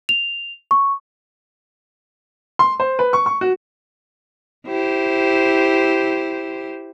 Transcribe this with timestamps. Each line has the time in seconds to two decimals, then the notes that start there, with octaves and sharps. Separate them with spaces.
0.09 F7
0.71 C#6
2.59 C6
2.80 C5
2.99 B4
3.13 C#6
3.26 C#6
3.41 F#4
4.66 E4 G4 C5